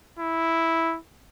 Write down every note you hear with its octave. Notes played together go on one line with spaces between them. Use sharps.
E4